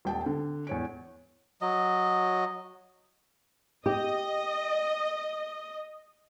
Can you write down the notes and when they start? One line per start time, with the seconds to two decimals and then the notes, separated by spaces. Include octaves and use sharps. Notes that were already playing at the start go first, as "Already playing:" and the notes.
0.05 D#1 G5 A5
0.26 D3
0.67 E2 C#5 D7
1.61 F#3 D#5
3.86 G4 D#5